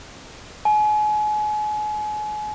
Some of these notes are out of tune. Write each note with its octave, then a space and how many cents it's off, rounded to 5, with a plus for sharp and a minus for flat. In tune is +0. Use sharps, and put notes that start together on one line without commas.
G#5 +35